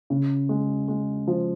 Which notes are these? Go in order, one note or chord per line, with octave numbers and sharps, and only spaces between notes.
C#3
G#3
G#3
F3